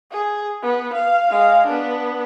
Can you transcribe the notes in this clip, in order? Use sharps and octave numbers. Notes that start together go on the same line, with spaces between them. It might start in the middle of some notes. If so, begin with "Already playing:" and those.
G#4
B3
F5
G#3 F5
B3 D4